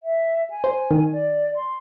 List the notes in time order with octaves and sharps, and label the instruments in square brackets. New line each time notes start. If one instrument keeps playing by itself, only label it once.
[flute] E5
G#5
[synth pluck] C5
D#3
[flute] D5
C6